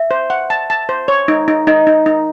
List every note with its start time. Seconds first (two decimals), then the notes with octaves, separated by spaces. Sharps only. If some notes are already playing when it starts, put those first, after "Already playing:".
Already playing: E5
0.11 C5
0.30 F#5
0.50 A5
0.70 A5
0.89 C5
1.08 C#5
1.28 D#4
1.48 D#4
1.67 D#4 D#5
1.87 D#4
2.06 D#4